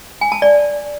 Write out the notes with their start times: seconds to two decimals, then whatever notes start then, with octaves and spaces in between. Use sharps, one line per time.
0.21 G#5
0.32 A5
0.42 D5